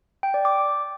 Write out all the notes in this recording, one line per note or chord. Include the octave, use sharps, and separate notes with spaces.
G5
D5
D6